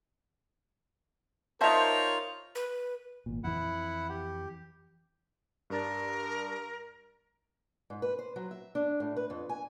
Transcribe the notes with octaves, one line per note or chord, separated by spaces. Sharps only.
D#4 F4 A#4 C5 C#5 D#5 E5 A5
B4
G#1 A#2
F2 E3 E4 F#5
G4
G2 D4 A#4 A6
G#2
B4
C5
F#3
E5
D4
A2
B4
F2
G#5